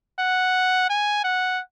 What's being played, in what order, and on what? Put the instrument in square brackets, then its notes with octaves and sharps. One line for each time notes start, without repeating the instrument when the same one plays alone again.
[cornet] F#5
G#5
F#5